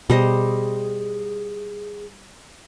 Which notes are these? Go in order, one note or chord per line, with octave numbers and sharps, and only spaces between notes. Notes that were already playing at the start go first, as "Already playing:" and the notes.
B2 G3 G#4 C5 D#5